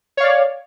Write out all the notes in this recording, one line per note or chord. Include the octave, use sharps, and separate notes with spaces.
C#5 D5 F5